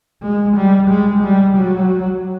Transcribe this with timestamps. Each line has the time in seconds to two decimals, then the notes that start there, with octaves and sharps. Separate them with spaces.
0.22 G#3
0.56 G3
0.89 G#3
1.23 G3
1.57 F#3